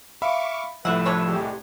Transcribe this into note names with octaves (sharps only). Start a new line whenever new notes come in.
E5 F5 B5 C#6 D6
C2 A2 F3 A3 B4 E5 F#5 E6
C3 D4 C#5
G3 G#3 G4